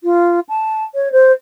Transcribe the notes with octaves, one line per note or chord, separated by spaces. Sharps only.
F4
A5
C#5
C5